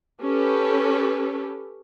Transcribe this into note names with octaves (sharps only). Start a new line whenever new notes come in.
C#4 G4 A4 B4